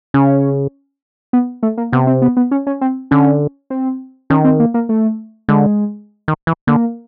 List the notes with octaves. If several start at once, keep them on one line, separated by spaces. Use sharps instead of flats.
C#3 C#4
B3
A3
A#3
C3 B3
C4
B3
B3
C#4
C#4
C4
D3 C#4
C4
D#3 C#4
C4
A#3
A#3
A3
D3 G#3
D#3
E3
D3 A#3